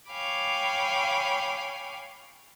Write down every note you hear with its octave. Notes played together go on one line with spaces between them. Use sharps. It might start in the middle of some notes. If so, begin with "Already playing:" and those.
C#5 F5 G5 G#5 B5 D6